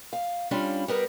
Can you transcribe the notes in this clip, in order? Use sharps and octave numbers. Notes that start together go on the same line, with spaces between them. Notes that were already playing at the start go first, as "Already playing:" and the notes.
F5
G3 C#4 D4 F4
G3 B3 A#4 B4